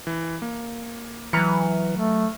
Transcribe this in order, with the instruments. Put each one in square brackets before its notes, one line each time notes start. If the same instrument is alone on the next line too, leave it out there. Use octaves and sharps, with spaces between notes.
[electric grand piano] E3
A#3
[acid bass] E3 [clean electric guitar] F#3 A#5 [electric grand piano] B4 F6 C#7
[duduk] A3